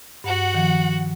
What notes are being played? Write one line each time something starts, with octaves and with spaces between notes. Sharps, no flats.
G2 F#4 F#5
D#3 F3